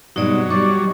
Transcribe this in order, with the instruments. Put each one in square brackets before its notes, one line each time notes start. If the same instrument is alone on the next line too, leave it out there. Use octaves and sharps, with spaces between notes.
[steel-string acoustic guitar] G2 B2 G#3 [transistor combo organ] F#3 [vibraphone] D#4 D5 D#6
[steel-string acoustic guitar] G3 D#4 [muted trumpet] D5 [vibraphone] C#6